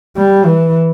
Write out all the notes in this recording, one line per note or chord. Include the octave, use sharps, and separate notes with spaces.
G3
E3